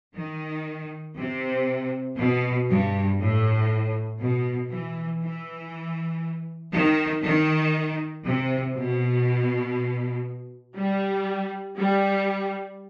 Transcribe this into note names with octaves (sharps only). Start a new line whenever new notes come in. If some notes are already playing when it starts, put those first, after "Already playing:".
D#3
C3
B2
G2
A2
B2
E3
E3
D#3
D#3
C3
B2
G3
G3